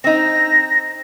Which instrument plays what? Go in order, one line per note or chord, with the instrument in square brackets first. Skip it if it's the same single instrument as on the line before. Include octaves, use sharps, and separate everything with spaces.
[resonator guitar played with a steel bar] C4 D#4 [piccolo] A#6